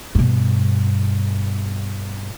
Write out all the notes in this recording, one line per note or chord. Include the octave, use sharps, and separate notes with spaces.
G2 B2